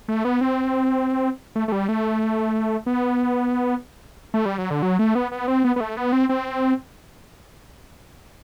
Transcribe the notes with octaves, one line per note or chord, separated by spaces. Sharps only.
A3
B3
C4
A3
A3
G3
A3
B3
A3
G3
F#3
D3
F#3
A3
B3
B3
C4
B3
B3
A3
B3
C4
C4